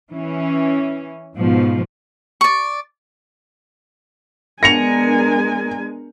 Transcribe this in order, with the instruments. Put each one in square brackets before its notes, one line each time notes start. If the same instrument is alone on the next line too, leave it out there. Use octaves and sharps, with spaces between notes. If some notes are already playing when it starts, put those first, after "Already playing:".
[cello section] E3 C#4
G#2 B2 F3
[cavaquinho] D5 C#6
[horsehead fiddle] G#3 G#5 [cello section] B3 D4 A#4 [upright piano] A#6 C#7 F7